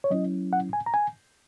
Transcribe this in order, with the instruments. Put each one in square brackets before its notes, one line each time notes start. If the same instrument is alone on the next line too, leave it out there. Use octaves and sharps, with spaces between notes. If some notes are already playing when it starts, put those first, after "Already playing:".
[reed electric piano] C#5
F#3 C#4 E4 D#5
F#5
G#5
A#5
G#5